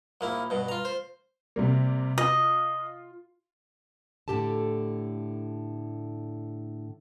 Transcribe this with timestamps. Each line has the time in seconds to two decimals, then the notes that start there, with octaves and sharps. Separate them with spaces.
0.21 A#1 A#3 E4
0.50 G2 B2
0.69 F4 A#5
0.85 C5
1.56 C3 G3 A#3
2.18 F4 D#5
4.28 A2 D3 G4 A4 A5